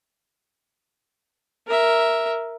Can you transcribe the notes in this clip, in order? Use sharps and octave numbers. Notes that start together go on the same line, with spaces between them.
A#4 E5